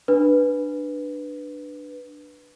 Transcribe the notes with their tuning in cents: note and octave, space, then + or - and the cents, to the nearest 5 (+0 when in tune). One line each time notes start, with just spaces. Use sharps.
D4 +15 B4 +0